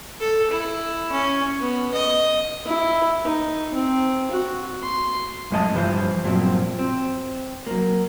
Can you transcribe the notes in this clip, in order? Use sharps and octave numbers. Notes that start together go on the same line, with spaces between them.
A4
E4
C#4
B3
D#5
E4
D#4
C4
F#4
C6
F#2 A2 G#3 G4 D#5 A5
G2 E3 F3 A4 C5
G2 A#2 F3 F#3 C4
C4
F#3 A#3